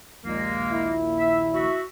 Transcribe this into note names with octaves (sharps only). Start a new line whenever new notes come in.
A#1 D#2 A#2 G#3 A#3
E4
E5
F#4 E5